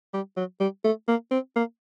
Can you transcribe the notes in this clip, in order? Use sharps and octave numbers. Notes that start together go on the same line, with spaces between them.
G3
F#3
G3
A3
A#3
C4
A#3